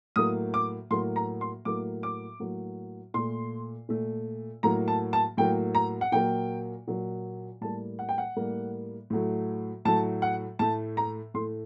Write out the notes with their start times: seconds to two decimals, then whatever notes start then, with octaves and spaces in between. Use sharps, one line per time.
0.16 A2 F#3 A#3 D#6
0.54 D6
0.90 A2 F#3 A#3 C6
1.16 A#5
1.41 C6
1.65 A2 F#3 A#3 D6
2.03 D6
2.40 A2 F#3 A#3
3.14 A#2 A3 C6
3.89 A#2 A3
4.63 A2 F#3 A#3 A#5
4.88 A5
5.13 A5
5.37 A2 F#3 A#3 G5
5.75 A#5
6.01 F#5
6.12 A#2 F#3 A#3 G5
6.87 A#2 F#3 A#3
7.61 A2 G3 A#3 A5
7.99 F#5
8.09 G5
8.18 F#5
8.36 A2 G3 A#3
9.10 A2 F#3 A3
9.85 A2 F#3 A3 A5
10.22 F#5
10.59 A2 A3 A5
10.97 A#5
11.34 A2 A3 C6